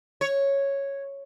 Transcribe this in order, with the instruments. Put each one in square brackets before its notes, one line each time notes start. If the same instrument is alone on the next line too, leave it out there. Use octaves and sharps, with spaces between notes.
[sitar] C#5